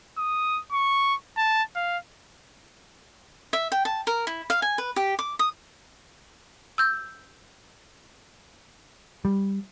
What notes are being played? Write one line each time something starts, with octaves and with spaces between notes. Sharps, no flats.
D#6
C#6
A5
F5
E5
G5
A5
A#4
E4
F5
G#5
B4
G4
D6
D#6
E6 G6
G3